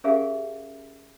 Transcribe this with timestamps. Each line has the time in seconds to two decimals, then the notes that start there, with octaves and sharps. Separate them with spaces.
0.04 C#4 G4 G#4 A#4 E5 F5